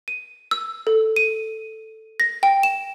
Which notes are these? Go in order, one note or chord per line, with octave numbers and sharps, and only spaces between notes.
D#7
E6
A4
D#7
A#6
G5
E7